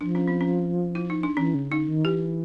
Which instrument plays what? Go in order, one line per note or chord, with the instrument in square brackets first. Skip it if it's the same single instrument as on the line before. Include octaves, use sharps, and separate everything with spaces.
[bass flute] F3 [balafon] D4
[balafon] C#4
C4
C#4
E4
D#4
D4
[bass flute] E3 [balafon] C#4
[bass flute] C#3
[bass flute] D3 [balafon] D#4
[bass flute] D#3
[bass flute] E3 [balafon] G4